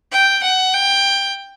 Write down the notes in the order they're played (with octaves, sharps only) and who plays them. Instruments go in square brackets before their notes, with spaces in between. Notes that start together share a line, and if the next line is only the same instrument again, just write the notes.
[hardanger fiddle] G5
F#5
G5